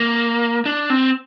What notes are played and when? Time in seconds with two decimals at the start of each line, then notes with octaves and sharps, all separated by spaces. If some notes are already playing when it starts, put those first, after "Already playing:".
Already playing: A#3
0.66 D4
0.90 C4